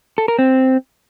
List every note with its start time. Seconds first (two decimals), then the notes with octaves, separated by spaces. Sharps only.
0.18 A4
0.28 A#4
0.39 C4